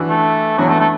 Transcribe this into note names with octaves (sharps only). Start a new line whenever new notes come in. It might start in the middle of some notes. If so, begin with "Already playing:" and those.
Already playing: E3 D4 F#4
A3
E3 F#3 B3 D4 F#4
A3
A3